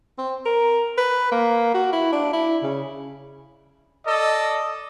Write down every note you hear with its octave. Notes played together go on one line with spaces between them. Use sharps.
C4
A#4
B4
A#3
F#4
E4
D4
E4
C#3
A4 D5 D#5